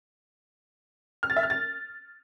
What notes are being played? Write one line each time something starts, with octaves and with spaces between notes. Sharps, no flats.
F6
A6
E5
F6
A6